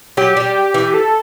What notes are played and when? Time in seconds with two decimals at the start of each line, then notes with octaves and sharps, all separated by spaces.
0.17 F#3 G4
0.37 G3
0.74 E3
0.94 A4